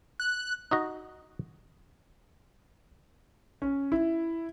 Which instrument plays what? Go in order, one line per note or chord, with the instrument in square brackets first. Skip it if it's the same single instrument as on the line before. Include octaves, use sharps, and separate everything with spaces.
[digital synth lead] F#6
[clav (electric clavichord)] D#4 F#4 D#5
[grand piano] C#4
E4